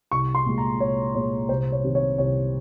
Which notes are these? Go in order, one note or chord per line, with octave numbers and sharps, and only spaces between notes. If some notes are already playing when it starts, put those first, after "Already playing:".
C2 C#6
C6
A#2 G#3
A#5
C2 C#5
A#2 G#3 C#5
C2 C5
C#5
C3 D#3 G3
C#5
C2 C#5